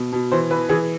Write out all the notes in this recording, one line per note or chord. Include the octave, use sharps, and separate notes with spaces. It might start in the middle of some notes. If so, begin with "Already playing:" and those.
Already playing: B2
B2
E3 C5
E3 B4
E3 G#4